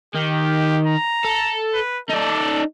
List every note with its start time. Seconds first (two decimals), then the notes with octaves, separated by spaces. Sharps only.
0.15 D#3 G4
0.86 A#5
1.24 A4
1.74 B4
2.09 D#4 A4 D5